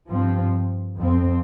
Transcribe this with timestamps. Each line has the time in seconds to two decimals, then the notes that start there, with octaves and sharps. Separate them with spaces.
0.10 G2 F3 C4
0.97 F2 F3 C4